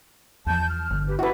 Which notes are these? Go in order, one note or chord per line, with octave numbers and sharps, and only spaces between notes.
E2 F3 A5 G6
F6
G1 D3
G4 B4
D4 E4 F#4 B4